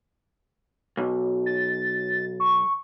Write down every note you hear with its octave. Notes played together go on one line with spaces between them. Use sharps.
B1
A6
C#6